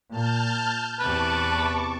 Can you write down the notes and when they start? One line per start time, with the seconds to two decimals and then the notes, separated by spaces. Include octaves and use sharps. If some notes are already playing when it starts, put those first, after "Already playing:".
0.10 A#2 A5 F6 G6
1.00 E2 C3 B4 A5 C#6 D6